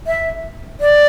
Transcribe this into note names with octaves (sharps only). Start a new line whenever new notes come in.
E5
D5